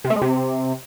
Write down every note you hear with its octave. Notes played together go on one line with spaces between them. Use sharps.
C3
A3
G#3
C3